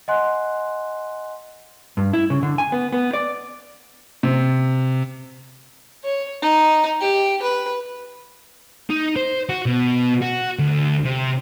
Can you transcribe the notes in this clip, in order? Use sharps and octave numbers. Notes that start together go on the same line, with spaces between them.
D#5 F#5 G#5 C6 F#6
G2
E4
C#3
D3
G#5
B3
B3
D5
C3
C#5
D#4
G4
B4
D#4
C5
F#4
B2
F#4
D2
C3